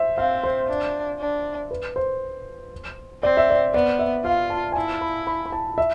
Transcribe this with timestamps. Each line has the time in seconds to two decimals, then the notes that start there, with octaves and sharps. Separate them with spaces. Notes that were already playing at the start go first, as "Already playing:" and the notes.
Already playing: C5 E5
0.17 C4 F5
0.44 C5
0.68 D4
1.20 D4
1.71 B4
1.96 C5
3.23 C4 D5
3.37 E5
3.50 D5
3.74 B3 D5
3.99 E5
4.25 F4 F5
4.50 A5
4.72 G#5
4.76 E4 A5
5.01 B5
5.27 B5
5.46 B5
5.52 A5
5.78 E5